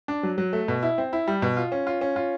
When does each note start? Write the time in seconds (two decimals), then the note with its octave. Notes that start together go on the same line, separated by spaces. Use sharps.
0.08 D4
0.23 F#3
0.38 F#3
0.53 A3
0.68 B2
0.83 E4
0.98 C4
1.13 E4
1.28 G3
1.42 B2
1.57 F4
1.72 C#4
1.87 F4
2.01 C#4
2.16 F4